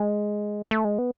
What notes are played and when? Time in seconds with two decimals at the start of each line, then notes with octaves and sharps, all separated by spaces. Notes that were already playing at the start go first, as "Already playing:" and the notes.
Already playing: G#3
0.71 A3
0.85 G#3
0.99 B3